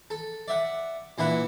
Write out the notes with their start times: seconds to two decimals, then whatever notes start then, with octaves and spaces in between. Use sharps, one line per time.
0.10 A4
0.48 D5 E5 F#5
1.18 A#2 E3 D4 B4 E5 F#5